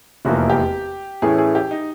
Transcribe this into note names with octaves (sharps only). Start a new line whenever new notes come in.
F1 E2 C3 F3 A#3 F#4
G4
A2 E3 A3 C#4 E4 G#4
G#4
G4
D#4